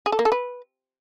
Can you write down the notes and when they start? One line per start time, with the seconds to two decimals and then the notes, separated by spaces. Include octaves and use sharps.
0.06 G#4
0.12 A4
0.19 A#3
0.25 A4
0.32 B4